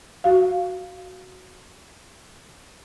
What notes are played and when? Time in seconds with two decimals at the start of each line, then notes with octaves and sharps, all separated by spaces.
0.24 F#4 F5